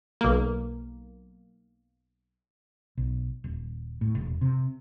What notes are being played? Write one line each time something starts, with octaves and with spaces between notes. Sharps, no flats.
B1 A#3
B1
D#1
A2
E1
C3